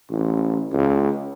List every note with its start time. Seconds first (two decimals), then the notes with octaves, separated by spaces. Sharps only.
0.10 A1
0.73 C#2